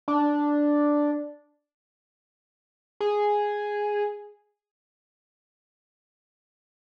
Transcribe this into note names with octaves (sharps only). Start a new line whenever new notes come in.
D4
G#4